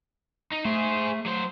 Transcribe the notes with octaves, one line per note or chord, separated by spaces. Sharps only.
D#4
A3 G#4 C5
F#3 C5